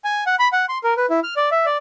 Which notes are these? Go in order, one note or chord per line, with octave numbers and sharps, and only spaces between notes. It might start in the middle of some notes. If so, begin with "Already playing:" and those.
G#5
F#5
B5
F#5
C6
A#4
B4
E4
F6
D5
E5
D5